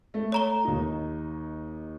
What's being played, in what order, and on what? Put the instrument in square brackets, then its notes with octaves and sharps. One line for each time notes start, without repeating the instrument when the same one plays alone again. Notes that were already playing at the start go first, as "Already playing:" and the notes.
[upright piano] A3
[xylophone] C#5 A#5 G7
[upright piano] D#2 D#4